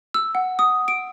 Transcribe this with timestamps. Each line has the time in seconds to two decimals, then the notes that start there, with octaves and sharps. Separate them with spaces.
0.14 E6
0.35 F#5
0.59 D#6
0.88 D7